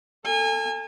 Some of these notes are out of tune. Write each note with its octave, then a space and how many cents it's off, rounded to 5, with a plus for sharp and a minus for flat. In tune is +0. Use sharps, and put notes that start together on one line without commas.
A4 +20 G#5 -30